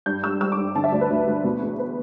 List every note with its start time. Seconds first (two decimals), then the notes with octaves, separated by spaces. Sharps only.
0.06 G2 G6
0.23 G3 E6
0.41 G3 E6
0.52 D6
0.58 G2
0.76 D3 A5
0.84 E5
0.92 D2 D5
1.01 B4
1.10 D2
1.27 D2
1.44 B2
1.62 E2
1.79 B4